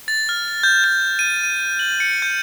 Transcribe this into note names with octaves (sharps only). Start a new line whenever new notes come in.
A6
F6
G6
G6
D#7
D#7
F#7
C#7
G6